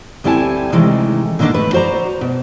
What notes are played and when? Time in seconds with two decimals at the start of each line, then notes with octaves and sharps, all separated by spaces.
0.24 D2 G3 C4 E4 G#5 A5
0.72 C3 D#3 E3 G#3 A3
1.39 A#2 D3 D#3 A#3 D4
1.54 A3 B4
1.73 F#4 C5 D5 A#5
2.21 B2